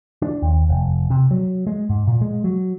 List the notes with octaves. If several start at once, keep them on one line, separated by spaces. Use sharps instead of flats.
D4
D#2
F1
C3
F#3
G#3
G#2
A#2
G#3
F#3